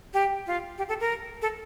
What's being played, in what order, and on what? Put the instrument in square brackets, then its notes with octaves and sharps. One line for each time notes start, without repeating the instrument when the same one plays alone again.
[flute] G4
F4
G4
A4
A#4
A4